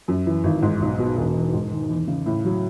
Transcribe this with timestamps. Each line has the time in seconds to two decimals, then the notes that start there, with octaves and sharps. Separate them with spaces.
0.08 F#2
0.26 E3
0.44 G#1
0.62 G#2
0.81 B1
0.99 B2
1.17 E1
1.36 E2
1.54 G#2
1.71 D#3
1.89 E2
2.08 C#3
2.26 A2
2.45 F#3